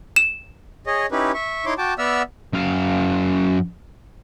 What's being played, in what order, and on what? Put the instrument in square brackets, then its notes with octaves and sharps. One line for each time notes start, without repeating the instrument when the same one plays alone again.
[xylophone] E7
[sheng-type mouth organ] G#4 C#5 D#5
C#4 D#4 E4 G4 B4
E5 C#6
D#4 E4 C#5 C6 D6
F#4 G5 A5 D6
B3 D5 E5 F#5 E6 F6
[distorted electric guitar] F#2 F5